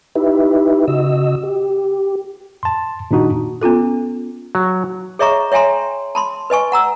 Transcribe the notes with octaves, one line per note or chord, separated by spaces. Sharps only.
D#4 E4 G4 B4 E5
C#3 F#4 D#5 E6
G4
A5 C6
A#2 D#3 D4 D#4 F#4
B3 C#4 F4 A4
F#3
G#4 C#5 D#5 E5 A#5 C#6
C#5 E5 G5 G#5 A#5 C6
A5 B5 C6
B4 D#5 G#5 C#6
F#5 A#5 E6